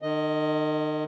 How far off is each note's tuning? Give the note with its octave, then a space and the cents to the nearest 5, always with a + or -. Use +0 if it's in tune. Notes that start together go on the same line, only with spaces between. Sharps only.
D#3 -40 D#5 +0